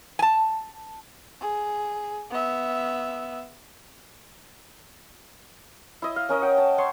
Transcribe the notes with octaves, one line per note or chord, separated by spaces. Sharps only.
G#5 A5
G#4
B3 E5
E4 D#5
F5
C#4 A#4 D#5
F#5 G5
A5
C#5 D#5 C6 C#6